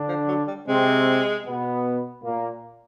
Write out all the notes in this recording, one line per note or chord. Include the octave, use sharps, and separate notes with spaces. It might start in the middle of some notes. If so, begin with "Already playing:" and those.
Already playing: D3 D4
F3
F#3
G3
C3 G#3 C4
B2 B3
A#2 A#3